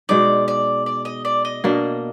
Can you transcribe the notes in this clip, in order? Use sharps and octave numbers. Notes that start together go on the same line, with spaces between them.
B2 G#3 D#4 D5
D5
D5
D#5
D5
D#5
B2 A#3 D4